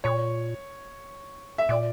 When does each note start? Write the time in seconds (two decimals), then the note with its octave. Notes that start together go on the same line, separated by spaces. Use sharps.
0.04 A#2 C#5
1.58 E5
1.69 A#2 D5